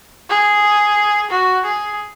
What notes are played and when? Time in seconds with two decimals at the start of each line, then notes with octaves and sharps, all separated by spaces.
0.29 G#4
1.30 F#4
1.65 G#4